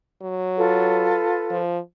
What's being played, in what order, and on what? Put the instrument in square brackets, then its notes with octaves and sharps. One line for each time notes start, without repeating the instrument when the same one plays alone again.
[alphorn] F#3
[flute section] F4 A4 B4
[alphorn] F3